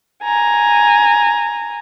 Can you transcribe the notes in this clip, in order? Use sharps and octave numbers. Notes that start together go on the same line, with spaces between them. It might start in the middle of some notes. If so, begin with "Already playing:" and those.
G#5 A#5